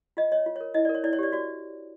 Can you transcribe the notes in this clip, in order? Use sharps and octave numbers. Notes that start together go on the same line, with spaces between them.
F4 D#5
C#5 D#5
F4
A#4 C#5
E4 D#5
A#4 D5
C#5
E4 D5
C#5
G4 D5
F#4 D5